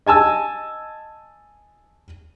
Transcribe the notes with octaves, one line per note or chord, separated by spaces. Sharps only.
D#5 G#5 A5 E6